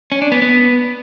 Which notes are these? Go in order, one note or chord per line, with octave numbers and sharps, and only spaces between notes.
C#4
D4
B3
B3